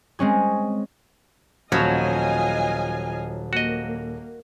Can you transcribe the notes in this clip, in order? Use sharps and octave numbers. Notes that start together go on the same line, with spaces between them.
G#3 C4 C#4 G#4
D#1 B2 F3 F#3 C#4 D#5 F5 G#5
A#3 F#4 D#5